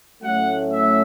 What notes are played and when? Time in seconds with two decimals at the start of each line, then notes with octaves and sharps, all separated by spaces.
0.23 A2 F#3 A3 C#4 F#5
0.71 E5